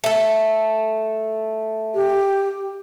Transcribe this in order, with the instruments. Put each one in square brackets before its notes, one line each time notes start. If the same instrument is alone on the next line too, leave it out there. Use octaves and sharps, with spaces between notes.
[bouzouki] A3 A4
[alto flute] G4